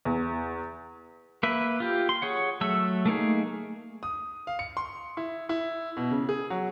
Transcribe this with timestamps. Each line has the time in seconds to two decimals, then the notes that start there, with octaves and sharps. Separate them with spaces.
0.05 E2
1.43 A#3 B4 E5
1.80 F4 G4
2.09 C6
2.22 G#4 C#5 F#5
2.61 F#3 A3 A4 E5 E6
3.06 A3 A#3 D#4 G#4
4.03 D#6
4.47 F5
4.59 C#7
4.77 C6
5.17 E4
5.49 E4
5.97 B2
6.11 C#3
6.29 G#4
6.50 F#3